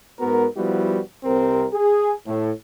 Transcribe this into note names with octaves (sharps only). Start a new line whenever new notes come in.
G#2 B3 F#4 A#4
F3 G3 B3 E4 F#4
C2 C3 C4 A#4
G#4
A2